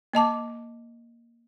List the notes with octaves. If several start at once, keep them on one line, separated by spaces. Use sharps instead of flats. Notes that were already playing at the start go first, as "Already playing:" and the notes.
A#3 D#5 A5 D6